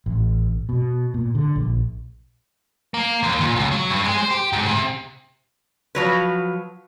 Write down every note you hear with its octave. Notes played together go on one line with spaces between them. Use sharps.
A1
B2
A#2
D3
A#1
A#3
D#2
A#2
C#2
F#3
G2
G#3
C5
G4
G#2
C3
F3 F#3 B4